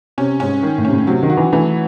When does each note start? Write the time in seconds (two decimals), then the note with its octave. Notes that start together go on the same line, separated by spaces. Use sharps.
0.18 C3 C#4
0.40 G#2 C#4
0.63 D#3
0.78 A2
0.85 C3 C#4
0.93 A2
1.07 C3 F#3
1.23 D#3
1.30 F#4
1.37 E3
1.52 E3 A3